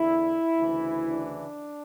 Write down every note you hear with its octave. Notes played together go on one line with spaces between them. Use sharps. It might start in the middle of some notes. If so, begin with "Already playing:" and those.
Already playing: E2 D3 E4
D2 C#3 E3
D4